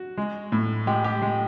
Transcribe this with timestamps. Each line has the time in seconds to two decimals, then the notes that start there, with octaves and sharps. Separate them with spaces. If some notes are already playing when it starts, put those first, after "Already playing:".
Already playing: F#4
0.17 G#3
0.52 A2
0.87 G#3 G4
1.04 G4
1.22 G#3